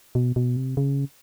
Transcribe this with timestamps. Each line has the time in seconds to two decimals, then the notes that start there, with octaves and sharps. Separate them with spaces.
0.15 B2
0.36 B2
0.57 C3
0.77 C#3